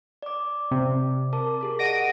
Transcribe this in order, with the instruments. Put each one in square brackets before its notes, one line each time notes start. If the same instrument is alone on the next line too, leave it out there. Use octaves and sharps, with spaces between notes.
[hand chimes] D5 D6
[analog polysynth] C3
[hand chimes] A#4 A5 D6
G4 G#4 A#4
[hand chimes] D5 D#5 F#5 [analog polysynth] A#6 D7 D#7